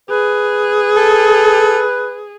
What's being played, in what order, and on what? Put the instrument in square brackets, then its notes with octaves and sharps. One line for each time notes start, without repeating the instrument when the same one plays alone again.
[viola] G#4 [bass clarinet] B4
[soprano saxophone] A4